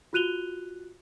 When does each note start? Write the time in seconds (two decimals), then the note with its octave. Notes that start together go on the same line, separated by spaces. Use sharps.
0.13 F4 F#4 F#6 D#7 F7 G7